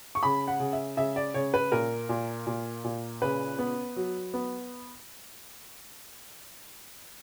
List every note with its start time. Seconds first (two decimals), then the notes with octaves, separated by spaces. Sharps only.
0.15 C#6
0.23 C#3 B5
0.48 F#5
0.60 C#3
0.73 E5
0.97 C#3 E5
1.16 D5
1.34 C#3 C#5
1.54 B4
1.72 A#2 A#4
2.09 A#2
2.47 A#2
2.84 A#2
3.22 C#3 B4
3.59 B3
3.96 F#3
4.34 B3